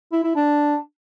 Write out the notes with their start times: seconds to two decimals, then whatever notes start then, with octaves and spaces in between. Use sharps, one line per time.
0.12 E4
0.24 E4
0.36 D4